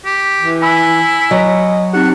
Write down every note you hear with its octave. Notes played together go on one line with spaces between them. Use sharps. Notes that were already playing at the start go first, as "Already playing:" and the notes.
G4
E3
E4 G#5 B5 E6
F#3 D#5
C4 D#4 G4 F#5